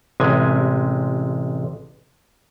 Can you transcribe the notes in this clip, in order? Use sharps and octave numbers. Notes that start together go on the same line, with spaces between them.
A1 C3 G#3 G#5